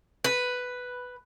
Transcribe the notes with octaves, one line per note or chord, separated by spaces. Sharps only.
B4